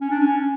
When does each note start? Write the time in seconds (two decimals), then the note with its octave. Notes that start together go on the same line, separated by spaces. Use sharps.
0.01 C#4
0.10 D4
0.20 C#4